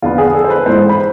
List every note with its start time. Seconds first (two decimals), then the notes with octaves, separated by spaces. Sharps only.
0.02 E2 D3 F3 B3 F4
0.18 G#4
0.35 A4
0.44 C5
0.50 B4
0.66 G#2 E3 G#3 C5
0.89 B5